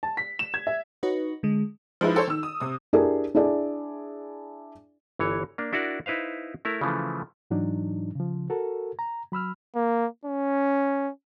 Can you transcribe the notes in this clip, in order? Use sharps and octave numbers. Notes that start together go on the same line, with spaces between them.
A5
B6
E7
G#6
E5
D#4 F#4 B4 C#5 D#5
D3 G#3
F3 G#3 D#4 E4 B4
A4 C5 C#5
D#3 E6
D#6
C3 D#6
D4 E4 G4 G#4 A#4 D5
D4 E4 G#4 D5
G1 E3 C#5
A#3 D4
D4 E4 F#4 A#4 D5
D#4 E4 B4 C5 F5
A3 E4 A#4
C#3 E3 F3 A3
G#2 E3 F#3 D4 D#4
C#3 F3
F#4 A4 A#4
A#5
F#3 B5 E6 F6
A#3
C#4